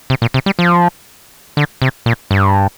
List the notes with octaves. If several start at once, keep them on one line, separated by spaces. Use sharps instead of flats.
C3
A#2
C3
G3
F3
D3
C3
A#2
G2